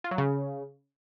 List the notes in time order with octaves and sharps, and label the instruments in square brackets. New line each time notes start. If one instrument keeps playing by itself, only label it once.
[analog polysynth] F4
F#3
C#3